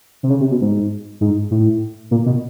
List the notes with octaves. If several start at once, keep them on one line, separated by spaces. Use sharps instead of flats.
C3
C#3
C3
B2
G#2
G#2
A2
A#2
B2